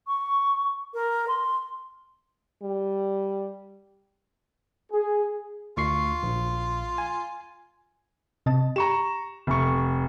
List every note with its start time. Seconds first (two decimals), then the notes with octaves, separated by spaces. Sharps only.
0.07 C#6
0.94 A#4
1.28 C6
2.62 G3
4.92 G#4
5.77 D2 F4 C#6 C7
6.23 A#1
6.98 G#5
8.46 C3 D#5 A5
8.76 G4 A#5 C#6 E7
9.47 F1 C#6